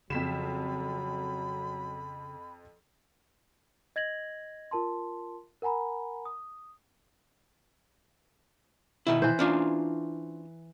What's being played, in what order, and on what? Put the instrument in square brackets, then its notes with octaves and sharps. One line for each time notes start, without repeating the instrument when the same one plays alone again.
[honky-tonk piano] F2 B6 E7 [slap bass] C#3 [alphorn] F#3 [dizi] B5
[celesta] D#5 G#6 A#6 F#7
F4 A#4 A5 C6
A#4 F#5 G#5 A#5 B5
D#6
[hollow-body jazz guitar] B2 D#3 E4
[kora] E3 C5
[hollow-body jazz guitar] C#4 D4 F4